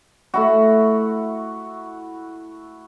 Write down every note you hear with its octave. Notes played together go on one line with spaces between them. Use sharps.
A3 E4 F#4